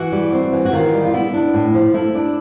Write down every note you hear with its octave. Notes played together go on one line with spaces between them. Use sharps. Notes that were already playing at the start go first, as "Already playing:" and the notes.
Already playing: E3 F#4
G3
C4
E3
F#4
D#3 F4
G3
F4
B3 E4
D4
A2
F3
A3 E4
D4